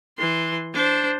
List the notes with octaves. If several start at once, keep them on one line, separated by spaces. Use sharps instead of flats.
E3 C6
D4 C5